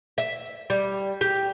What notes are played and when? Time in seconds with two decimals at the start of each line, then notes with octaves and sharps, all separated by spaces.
0.18 E5
0.70 G3
1.21 G4